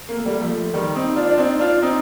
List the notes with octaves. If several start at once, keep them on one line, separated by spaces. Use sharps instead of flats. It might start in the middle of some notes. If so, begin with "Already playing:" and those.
A#3
A3
G3 A#3
F3 A3
D#3 G3
C4 D#4
D4 F4
D4
C4 D#4
D4 F4
C4 D#4